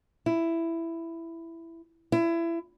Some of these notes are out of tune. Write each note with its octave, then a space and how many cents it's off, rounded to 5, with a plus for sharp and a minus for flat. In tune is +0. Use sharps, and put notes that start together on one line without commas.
E4 +10
E4 +25